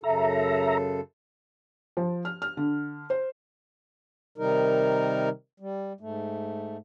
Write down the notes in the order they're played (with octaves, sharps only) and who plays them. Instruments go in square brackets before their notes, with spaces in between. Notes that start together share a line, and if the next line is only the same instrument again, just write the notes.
[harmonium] F#2 C#3 A4 [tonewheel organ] E5 A#5
[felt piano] F3
F6
F6
D3
C5
[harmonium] C3 D#3 G3 D#4 A#4
G3
G#2 A3